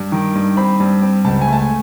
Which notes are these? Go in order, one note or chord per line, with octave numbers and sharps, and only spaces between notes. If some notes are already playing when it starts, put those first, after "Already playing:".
Already playing: G2
D#3
G2
C4 B5
G2
C4
C#2 A5
G#5
A3
A5
G#5